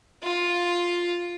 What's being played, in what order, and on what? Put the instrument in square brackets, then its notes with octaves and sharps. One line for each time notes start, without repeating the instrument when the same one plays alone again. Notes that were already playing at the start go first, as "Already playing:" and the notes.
[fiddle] F4